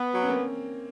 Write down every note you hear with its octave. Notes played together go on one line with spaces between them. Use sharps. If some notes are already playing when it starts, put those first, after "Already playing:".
Already playing: B3
F#3
C#4
A#3 C4